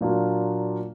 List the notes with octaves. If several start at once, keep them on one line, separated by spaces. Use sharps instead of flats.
A#2 F#3 A#3 D4 F4